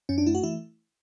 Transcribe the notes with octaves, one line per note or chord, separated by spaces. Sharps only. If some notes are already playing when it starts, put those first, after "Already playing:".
F#2 C#4
D4
A3 E4
F#4
E3 E4